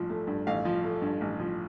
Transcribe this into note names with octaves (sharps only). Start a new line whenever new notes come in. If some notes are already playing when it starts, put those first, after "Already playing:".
Already playing: A1 G2 F3
A3
G2
A1 F5
F3
A3
G2
A1
F3